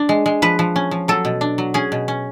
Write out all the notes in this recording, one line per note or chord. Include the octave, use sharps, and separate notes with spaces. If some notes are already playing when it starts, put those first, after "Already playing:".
Already playing: D4
G#3
G#3
F3 B4
F3
C#4
F3
F#3 A4
B2
D4
F#3
C#4 G#4
B2
C#4